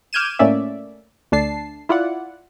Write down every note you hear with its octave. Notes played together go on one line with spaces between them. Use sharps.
D6 F6 G6 G#6 D#7 E7
A2 A3 A#3 C#4 D5 E5
D2 A3 D4 A5 C7
E4 F4 D5 F#5